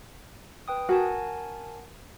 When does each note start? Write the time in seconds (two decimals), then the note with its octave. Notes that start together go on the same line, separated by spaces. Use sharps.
0.68 B4 G5 D#6
0.89 F#4 A#4 G#5 A5